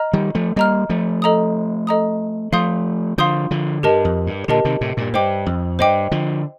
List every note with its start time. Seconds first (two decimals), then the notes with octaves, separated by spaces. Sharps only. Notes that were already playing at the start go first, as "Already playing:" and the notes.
Already playing: D#5 A#5 F6
0.13 D#3 G3
0.35 F3 A3
0.56 G3 A#3 D#5 A#5 F6
0.89 F3 A3
1.22 A4 D#5 A#5 D#6
1.87 A4 D#5 A#5 D#6
2.52 F3 A3 F5 C6 D#6 G6
3.18 D3 F3 F5 C6 D#6 G6
3.51 D3 F3
3.83 G2 G4 A#4 D#5 A5
4.05 F2
4.27 G2
4.48 A#2 D3 G4 A#4 D#5 A5
4.65 C3 D#3
4.81 A2 C3
4.97 G2 A#2
5.13 G2 C5 D#5 G5 D6
5.46 F2
5.79 G2 C5 D#5 G5 D6
6.11 D3 F3